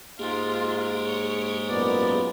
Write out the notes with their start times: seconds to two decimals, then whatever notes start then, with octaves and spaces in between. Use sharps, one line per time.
0.19 G#2 G#3 A#3 F4 G4 G#4
1.06 C#5
1.69 F#2 A#2 B3 D5